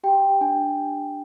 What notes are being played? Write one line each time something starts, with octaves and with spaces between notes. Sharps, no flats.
G4 G5
D4 G#5